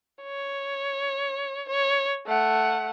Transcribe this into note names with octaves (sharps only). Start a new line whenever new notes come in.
C#5
C#5
A3 F#5